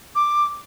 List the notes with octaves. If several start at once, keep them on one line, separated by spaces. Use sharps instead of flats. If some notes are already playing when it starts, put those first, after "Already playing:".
D6